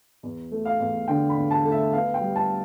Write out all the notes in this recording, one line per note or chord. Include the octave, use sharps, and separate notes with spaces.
E2
A3
F5
E2
D3 G5
B5
E2
A5
A3
E5
B3 F5
G5
G3
A5